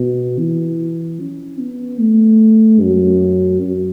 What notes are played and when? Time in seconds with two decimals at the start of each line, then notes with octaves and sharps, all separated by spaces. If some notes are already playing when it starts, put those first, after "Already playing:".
Already playing: B2
0.39 E3
1.20 C#4
1.59 B3
2.00 A3
2.82 F#2
3.62 F#2